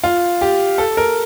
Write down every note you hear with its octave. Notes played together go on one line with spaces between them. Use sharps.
F4
G4
A4
A#4